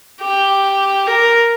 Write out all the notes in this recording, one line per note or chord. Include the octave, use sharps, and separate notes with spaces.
G4
A#4